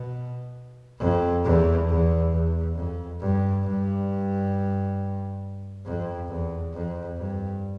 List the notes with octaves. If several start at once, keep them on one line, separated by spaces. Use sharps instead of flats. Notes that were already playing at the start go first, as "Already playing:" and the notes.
Already playing: B2
F2
E2
E2
E2
F2
G2
G2
F2
E2
F2
G2